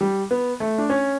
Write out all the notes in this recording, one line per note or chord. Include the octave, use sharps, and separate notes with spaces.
G3
B3
A3
D4
C#4